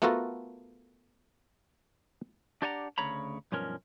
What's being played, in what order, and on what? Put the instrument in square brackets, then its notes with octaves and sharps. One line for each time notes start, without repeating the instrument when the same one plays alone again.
[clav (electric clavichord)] A3 B3 F4 F#4 A4 A#4
[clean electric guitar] D4 G4 D5 F#5 G#5 A#5
D2 C#3 C#5 A#5 B5
B1 G2 F3 C#4 A#4